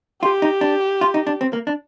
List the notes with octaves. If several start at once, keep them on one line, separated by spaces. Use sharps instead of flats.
F4 G4
D#4
D4
F4
D#4
D4
C4
A#3
D4